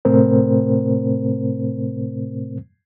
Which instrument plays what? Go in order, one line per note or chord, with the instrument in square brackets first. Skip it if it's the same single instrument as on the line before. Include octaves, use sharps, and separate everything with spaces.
[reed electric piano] A2 C3 A3 C4 A#4 C5